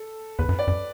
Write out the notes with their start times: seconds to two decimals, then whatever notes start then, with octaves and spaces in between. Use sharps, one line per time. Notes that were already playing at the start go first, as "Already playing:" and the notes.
Already playing: A4
0.39 E2 B4
0.49 F#2
0.59 D5
0.67 F#2